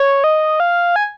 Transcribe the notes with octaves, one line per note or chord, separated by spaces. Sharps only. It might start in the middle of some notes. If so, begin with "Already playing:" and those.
Already playing: C#5
D#5
F5
G#5